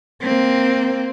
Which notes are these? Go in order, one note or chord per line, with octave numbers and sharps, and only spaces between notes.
A#3 C4